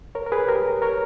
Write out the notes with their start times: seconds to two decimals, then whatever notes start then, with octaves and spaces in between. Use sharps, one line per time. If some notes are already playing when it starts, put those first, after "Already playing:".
0.15 A#4 C#5
0.26 A#4
0.32 G#4 B4
0.48 G4 A#4
0.82 A#4 C#5